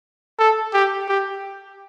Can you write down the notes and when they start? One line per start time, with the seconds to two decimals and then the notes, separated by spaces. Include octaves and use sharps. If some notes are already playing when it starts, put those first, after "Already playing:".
0.39 A4
0.73 G4
1.08 G4